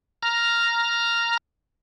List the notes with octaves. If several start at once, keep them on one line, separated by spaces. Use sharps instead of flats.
A#5 F6